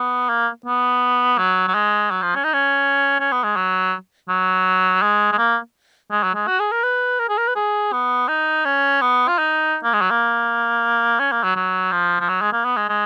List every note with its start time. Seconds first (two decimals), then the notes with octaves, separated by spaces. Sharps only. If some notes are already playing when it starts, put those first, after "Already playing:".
Already playing: B3
0.29 A#3
0.66 B3
1.38 F#3
1.68 F#3
1.74 G#3
2.11 F#3
2.22 F3
2.35 C#4
2.44 D#4
2.53 C#4
3.20 C#4
3.32 B3
3.44 G#3
3.56 F#3
4.29 F#3
5.02 G#3
5.32 G#3
5.38 A#3
6.11 G#3
6.23 F#3
6.35 G#3
6.47 F#4
6.59 G#4
6.72 A#4
6.83 B4
7.19 A#4
7.29 G#4
7.38 A#4
7.48 B4
7.56 G#4
7.92 B3
8.28 D#4
8.65 C#4
9.01 B3
9.28 F4
9.38 D#4
9.83 A#3
9.93 G#3
10.01 F#3
10.10 A#3
11.19 C#4
11.32 A#3
11.43 F#3
11.56 F#3
11.92 F3
12.20 F3
12.29 F#3
12.41 G#3
12.53 A#3
12.65 B3
12.77 G#3
12.89 G#3